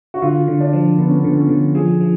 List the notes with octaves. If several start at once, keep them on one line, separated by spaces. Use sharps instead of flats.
F#4
D3 F4
D3
D4
F3
D3 B3
C#4
B3
D3
B3
C#4
D3
F3 G#4
F3